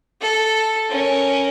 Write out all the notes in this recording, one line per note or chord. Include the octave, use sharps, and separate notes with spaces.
A4
C#4 A#4